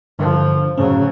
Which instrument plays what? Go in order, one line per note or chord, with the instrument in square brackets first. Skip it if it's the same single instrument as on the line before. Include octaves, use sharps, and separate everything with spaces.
[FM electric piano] G2 [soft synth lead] D3 [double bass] F3
[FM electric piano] F#2 A2 C#4 [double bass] C#3 F#3 [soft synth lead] C5